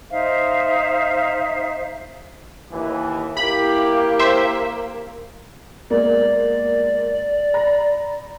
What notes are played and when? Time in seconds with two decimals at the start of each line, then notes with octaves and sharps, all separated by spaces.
0.10 D#4 C5 E5 F5
2.72 D#2 E3
3.37 A#3 E4 G4 B5
4.19 C5 E5
5.90 G#3 A#3 B3 D5
7.54 A#5 B5 A#6